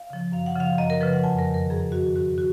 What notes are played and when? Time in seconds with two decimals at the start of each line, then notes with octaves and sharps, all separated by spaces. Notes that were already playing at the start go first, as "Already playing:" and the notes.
Already playing: F5
0.10 C#3 F3
0.32 F#2 F5
0.46 F#5
0.56 C#3 F3 F5
0.78 F#2 D#5
0.90 A#4
1.01 C#3 F3 B4
1.13 F#5
1.23 F2 G#5
1.39 A#4
1.47 D#3
1.54 A#4
1.70 F#2 G#4
1.92 D#3 F#4
2.15 G#2 F#4
2.38 F#4